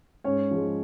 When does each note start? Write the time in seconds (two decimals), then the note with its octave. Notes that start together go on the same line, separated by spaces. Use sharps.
0.24 G#2 C#4 C#5
0.51 F3 G#3